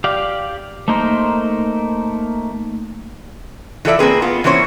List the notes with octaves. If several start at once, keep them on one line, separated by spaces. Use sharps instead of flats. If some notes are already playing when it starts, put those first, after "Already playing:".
G4 D5 F5
A3 A#3 D#4 A#4 C5
E3 F4 A4 D5 E5
A#3 C4 G#4 B4
B3 F4
E3 A#3 C#4 C5 C#5